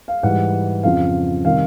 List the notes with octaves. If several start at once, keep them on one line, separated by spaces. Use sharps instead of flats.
F5
G#2 E3 G3 F#5
F2 C#3 F3 F5
C3 D#3 G3 F5